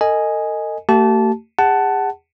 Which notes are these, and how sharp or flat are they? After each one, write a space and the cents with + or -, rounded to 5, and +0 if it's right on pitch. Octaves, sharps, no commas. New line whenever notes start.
A4 +45 D#5 +0 G#5 +0
A3 +40 G4 -35 A5 -15
G#4 -40 F#5 +20 A5 +0